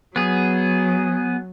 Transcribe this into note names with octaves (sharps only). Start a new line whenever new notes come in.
F#3 B3 G#4